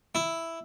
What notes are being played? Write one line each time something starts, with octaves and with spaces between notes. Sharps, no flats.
E4